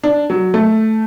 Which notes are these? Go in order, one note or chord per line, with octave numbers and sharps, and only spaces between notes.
D4
F#3
A3